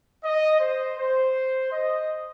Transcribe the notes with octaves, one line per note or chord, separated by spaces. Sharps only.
D#5
C5
C5
D#5